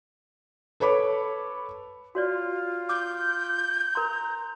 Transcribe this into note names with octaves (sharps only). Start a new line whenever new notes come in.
A4 B4 C#5 B5 D6
F4 F#4 C#5 D5
D6 G6
A#4 A#5 C6